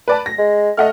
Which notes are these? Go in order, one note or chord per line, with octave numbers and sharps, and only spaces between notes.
B4 D5 A5
A#6
G#3
A3 D#5 F#5 F6